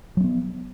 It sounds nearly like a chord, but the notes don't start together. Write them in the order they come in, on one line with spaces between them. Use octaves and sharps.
F#3 C4 B3